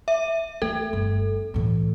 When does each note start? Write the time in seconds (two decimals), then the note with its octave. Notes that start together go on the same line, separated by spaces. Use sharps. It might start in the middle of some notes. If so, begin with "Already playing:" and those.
0.08 E5
0.62 A3 A4
0.93 G1
1.54 A2 E3